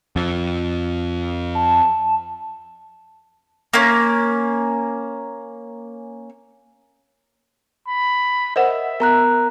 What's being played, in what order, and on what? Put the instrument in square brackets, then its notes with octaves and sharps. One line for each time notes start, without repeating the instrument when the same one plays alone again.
[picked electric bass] F2
[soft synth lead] A5
[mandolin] A#3 C#4
[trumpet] B5
[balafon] A#4 C5 F#5 [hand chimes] D#5 [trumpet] E5
[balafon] B3 [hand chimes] A#4 A#5 F#6